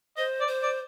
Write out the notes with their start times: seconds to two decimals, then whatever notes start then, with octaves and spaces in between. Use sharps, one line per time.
0.17 C5 D#5
0.41 D5
0.48 C5
0.63 D5